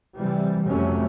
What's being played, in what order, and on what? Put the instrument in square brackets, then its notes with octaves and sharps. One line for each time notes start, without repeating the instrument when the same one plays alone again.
[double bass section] C3 E3 G3
F2 C3 F#3 A3 C#4